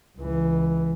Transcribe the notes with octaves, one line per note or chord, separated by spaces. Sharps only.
C#2 E3